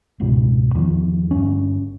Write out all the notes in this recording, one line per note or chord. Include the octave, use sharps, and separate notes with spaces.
E1 C#2 G#2 B2
E2 D#3 F3
G1 G2 C#4